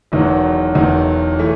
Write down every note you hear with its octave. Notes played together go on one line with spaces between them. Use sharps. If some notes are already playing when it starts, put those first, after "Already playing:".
E1 E2 D#3 F#3
E1 E2 D#3 F#3
E3 A3